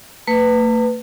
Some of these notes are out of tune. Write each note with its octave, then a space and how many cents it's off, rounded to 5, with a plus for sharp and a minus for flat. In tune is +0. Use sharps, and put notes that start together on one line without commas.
A3 +45 B4 +10